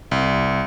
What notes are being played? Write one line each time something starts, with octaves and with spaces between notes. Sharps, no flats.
C2